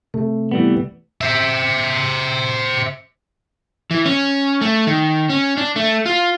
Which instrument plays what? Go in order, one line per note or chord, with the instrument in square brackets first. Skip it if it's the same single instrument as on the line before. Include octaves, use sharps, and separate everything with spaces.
[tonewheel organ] C3 [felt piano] A3
[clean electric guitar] E3 G3 B3
[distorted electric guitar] C5 E5
[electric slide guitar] E3
C#4
A3
D#3
C#4
D4
A3
F4